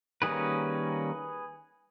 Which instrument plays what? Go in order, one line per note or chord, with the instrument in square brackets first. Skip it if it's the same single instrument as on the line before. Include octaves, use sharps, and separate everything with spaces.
[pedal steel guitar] D#3 G3 A#3 C#4 G#4 B4